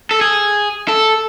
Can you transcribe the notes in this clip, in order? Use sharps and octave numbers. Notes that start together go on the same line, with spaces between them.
A4
G#4
A4